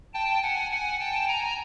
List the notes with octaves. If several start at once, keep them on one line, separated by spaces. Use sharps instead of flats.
G5 A5
F#5 G#5
F#5 G#5
G5 A5
G#5 A#5